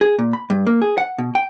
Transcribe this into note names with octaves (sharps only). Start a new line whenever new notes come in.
G#4
A#2
B5
G2
A#3
G#4
F#5
B2
G5